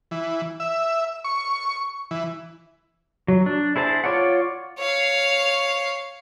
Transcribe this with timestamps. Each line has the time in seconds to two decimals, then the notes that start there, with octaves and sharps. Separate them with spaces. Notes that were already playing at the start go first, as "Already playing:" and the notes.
0.11 E3
0.60 E5
1.24 C#6
2.11 E3
3.28 F#3
3.46 D4
3.76 E4 G#4 C5 A5
4.04 F4 C#5 D5 F#5
4.78 C#5 F5